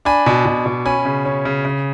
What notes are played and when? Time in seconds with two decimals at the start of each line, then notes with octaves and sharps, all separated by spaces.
0.05 D4 G#5 B5
0.26 B2
0.45 B2
0.66 B2
0.86 C#4 G#5 B5
1.05 C#3
1.25 C#4
1.45 C#3
1.65 C#3